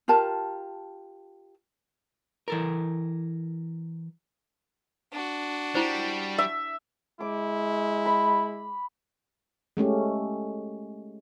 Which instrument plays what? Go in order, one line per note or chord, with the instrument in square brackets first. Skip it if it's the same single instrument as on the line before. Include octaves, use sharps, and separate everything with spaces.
[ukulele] F4 G4 A#4 A5
[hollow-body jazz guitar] E3 A4 A#4
[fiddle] D4 F#4
[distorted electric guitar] G3 [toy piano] E4 C5
[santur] E5
[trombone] G#3 [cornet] E4 [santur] D6
[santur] B5
[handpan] G#3 A3 C#4 G4